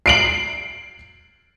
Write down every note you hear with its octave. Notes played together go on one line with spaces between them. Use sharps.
C7 D7 F#7